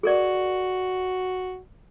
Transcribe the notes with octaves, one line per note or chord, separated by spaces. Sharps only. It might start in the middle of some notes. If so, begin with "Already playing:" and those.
F#4 G#4 A#4 D5